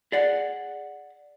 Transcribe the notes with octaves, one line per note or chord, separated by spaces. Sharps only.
G#4 D5 F#5